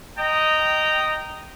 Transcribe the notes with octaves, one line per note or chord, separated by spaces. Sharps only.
D#5 G5 A#5